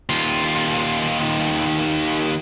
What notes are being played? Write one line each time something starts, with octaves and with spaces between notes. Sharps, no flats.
D#2 F4